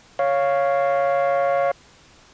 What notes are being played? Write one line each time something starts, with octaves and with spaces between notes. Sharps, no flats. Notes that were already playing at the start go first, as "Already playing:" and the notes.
C#5 F5